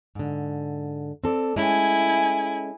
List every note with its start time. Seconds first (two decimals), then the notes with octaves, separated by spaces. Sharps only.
0.15 G#2 D3
1.24 C4 A4 D5
1.56 G#3 A3 C#4 E4 G#5